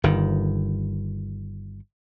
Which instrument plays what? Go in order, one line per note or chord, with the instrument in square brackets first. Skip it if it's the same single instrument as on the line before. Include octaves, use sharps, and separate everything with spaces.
[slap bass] G1 D#3